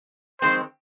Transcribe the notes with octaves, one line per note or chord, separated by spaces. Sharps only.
F2 D#3 G#3 C4 C5